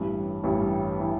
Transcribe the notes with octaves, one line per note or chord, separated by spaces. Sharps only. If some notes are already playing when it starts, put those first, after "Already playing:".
Already playing: A1 G2 E3
A1 G2 E3
E3